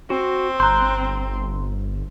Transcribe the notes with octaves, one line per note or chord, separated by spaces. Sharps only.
C4 F#4
G1 A#5 C6 F#6 G6